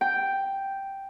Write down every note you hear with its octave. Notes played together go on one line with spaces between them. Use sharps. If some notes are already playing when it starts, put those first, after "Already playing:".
G5